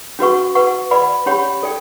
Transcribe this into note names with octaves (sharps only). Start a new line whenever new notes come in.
C#4 F#4 B4 F#5 C#6
B4 F#5 C#6
B4 D5 F#5 B5
C#4 G4 C#5 F#5 B5
A4 D5 G5